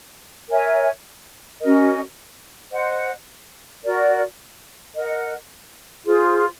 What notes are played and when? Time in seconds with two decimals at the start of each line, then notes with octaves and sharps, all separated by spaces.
0.49 A#4 C#5 E5 G#5
1.61 C#4 F#4 A#4 D#5
2.72 C5 D#5 F#5
3.84 F#4 A#4 D5
4.94 A#4 D#5 F#5
6.06 F4 G#4 C5